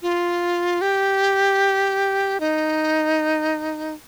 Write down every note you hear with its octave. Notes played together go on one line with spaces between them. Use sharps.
F4
G4
D#4